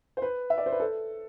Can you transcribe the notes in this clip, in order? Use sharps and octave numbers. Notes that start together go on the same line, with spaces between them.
C5
B4
E5
D5
C5
B4
A4